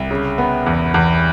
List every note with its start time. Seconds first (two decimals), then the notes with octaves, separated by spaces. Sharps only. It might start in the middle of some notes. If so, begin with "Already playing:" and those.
Already playing: C2
0.11 C#3
0.38 B3
0.66 E2
0.94 E2